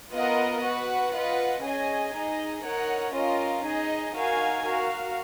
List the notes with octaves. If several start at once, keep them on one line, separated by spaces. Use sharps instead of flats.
B3 F4 A#4 D#5 F#5
F#4 B4 F#5
F4 B4 D#5 F#5
C#4 G#4 D#5 G#5
D#4 G#4 D#5
D#4 A#4 C#5 F#5
C#4 F4 A#4 D#5
D#4 G#4 D#5
D#4 F#4 A#4 F5 G#5
F#4 A#4 F5